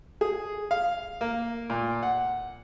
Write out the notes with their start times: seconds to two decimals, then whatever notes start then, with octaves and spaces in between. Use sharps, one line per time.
0.21 G#4
0.71 F5
1.21 A#3
1.70 A#2
2.03 F#5